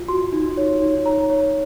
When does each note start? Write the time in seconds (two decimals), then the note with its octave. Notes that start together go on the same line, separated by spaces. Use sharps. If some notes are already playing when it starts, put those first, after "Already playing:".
Already playing: F4
0.08 F#4 C6
0.33 D#4
0.57 C#5
0.82 D#4
1.06 C#5 A#5
1.30 C#5